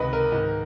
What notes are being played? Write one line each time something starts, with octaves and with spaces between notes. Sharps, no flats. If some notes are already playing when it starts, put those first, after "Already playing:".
Already playing: C#2 C3 D#3 B4 D#5
A#4
G#2 D#3